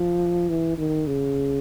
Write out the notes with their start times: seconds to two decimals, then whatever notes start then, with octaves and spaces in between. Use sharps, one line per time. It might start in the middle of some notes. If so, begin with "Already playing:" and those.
Already playing: F3
0.49 E3
0.78 D#3
1.07 C#3